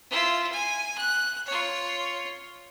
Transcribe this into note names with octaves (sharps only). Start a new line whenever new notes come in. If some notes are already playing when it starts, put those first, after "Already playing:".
E4 F4
G#5
F#6
F4 C#5